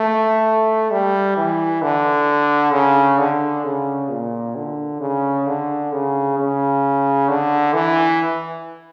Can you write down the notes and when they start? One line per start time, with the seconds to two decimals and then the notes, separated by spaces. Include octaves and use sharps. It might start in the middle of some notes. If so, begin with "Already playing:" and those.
Already playing: A3
0.91 G3
1.37 E3
1.82 D3
2.73 C#3
3.18 D3
3.65 C#3
4.09 A#2
4.56 D3
5.01 C#3
5.47 D3
5.92 C#3
6.38 C#3
7.28 D3
7.73 E3